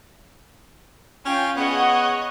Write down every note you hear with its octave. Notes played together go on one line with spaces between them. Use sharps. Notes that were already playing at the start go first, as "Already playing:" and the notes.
C#4 F4 G5
B3 G#4 C#5 D#5 F#5